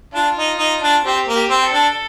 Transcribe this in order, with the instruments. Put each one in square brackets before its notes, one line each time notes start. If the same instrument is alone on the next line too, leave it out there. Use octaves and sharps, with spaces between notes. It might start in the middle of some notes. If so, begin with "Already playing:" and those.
[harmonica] D4 [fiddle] F4
[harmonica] D#4
D#4
D4
[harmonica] C4 [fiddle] G4
[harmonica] A#3
[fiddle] G4
[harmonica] C4
[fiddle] A4
[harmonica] D4